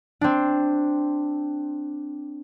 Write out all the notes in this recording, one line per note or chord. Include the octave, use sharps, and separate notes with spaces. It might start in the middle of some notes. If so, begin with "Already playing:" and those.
C4 D4